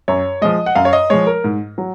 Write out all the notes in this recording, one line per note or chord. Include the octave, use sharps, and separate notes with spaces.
F#2 C#5
F3 G#3 D#5
F#5
F#2 F5
C#5
D#5
F3 G#3 C#5
A#4
G#2
F#3